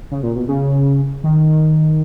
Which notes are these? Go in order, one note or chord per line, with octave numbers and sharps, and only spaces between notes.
C#3
A#2
B2
C#3
D#3